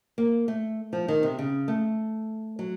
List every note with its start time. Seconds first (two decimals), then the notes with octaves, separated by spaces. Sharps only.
0.18 A#3
0.48 A3
0.93 F3
1.08 D#3
1.23 C3
1.39 C#3
1.68 A3
2.59 F#3